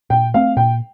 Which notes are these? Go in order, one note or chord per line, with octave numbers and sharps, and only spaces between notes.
A#2 G5
A3 C4 F5
A#2 G5